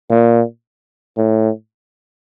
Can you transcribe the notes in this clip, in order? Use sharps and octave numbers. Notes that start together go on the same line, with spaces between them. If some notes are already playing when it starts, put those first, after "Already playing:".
A#2
A2